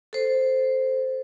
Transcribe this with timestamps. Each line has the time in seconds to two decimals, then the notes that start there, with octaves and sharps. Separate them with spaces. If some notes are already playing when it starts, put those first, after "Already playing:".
0.13 A4 C5